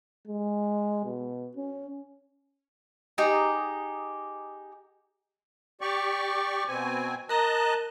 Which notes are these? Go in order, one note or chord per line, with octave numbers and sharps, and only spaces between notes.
G#3
B2
C#4
D#4 G4 G#4 A#5
G4 D5 C#6
B2 C4 G#5
A#4 D#5 A5 A#5 F#6